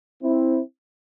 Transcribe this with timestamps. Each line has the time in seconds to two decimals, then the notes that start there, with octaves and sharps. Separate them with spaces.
0.23 C4 E4